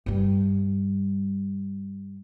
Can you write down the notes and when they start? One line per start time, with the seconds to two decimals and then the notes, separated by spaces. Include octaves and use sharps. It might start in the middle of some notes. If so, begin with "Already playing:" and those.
0.06 G2 G3